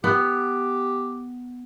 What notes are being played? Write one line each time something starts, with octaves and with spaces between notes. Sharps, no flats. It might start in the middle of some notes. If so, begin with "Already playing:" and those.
B3 G4